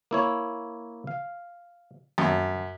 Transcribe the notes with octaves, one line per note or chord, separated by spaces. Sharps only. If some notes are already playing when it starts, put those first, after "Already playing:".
A#3 E4 C#5
F5
F#2 A5